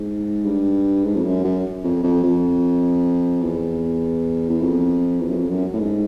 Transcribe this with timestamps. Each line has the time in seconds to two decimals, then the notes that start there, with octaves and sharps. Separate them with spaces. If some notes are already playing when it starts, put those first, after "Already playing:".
Already playing: G#2
0.45 G2
1.04 G#2
1.15 F2
1.25 F#2
1.45 F#2
1.84 F2
2.04 F2
2.24 F2
3.42 E2
4.49 E2
4.61 F2
5.20 E2
5.30 F#2
5.35 F2
5.50 F#2
5.73 A2
5.79 G#2